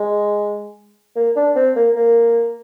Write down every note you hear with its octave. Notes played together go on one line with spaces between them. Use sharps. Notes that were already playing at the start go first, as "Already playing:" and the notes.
Already playing: G#3
A#3
D4
C4
A#3
A#3